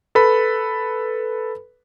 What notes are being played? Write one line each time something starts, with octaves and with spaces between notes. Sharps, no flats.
A4 B4 B5